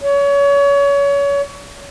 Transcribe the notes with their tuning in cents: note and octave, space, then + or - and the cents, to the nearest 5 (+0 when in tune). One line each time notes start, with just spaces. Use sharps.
C#5 +30